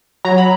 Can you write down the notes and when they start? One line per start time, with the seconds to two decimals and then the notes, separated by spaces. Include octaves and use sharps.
0.25 F#3 A#5
0.38 B5